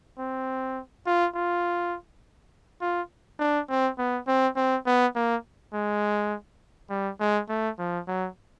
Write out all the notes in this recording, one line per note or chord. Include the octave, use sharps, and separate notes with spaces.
C4
F4
F4
F4
D4
C4
B3
C4
C4
B3
A#3
G#3
G3
G#3
A3
F3
F#3